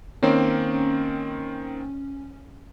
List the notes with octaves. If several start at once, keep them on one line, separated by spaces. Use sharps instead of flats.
D#3 A#3 C4 C#4